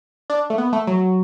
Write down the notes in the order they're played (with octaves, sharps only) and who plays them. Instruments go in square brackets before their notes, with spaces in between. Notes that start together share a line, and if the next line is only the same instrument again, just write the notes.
[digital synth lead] D4
A3
B3
A3
F#3